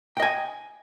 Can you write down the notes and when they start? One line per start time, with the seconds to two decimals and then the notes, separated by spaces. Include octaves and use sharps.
0.17 G5
0.20 D#5
0.22 G#5